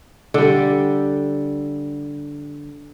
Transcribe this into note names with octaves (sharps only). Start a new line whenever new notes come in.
D3 G3